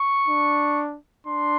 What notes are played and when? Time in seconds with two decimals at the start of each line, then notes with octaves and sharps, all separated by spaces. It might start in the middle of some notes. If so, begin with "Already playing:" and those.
Already playing: C#6
0.28 D4
1.27 D4 C6